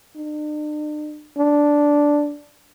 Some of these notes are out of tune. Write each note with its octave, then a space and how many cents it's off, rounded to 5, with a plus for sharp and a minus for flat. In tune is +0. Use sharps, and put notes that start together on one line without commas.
D4 +45
D4 -5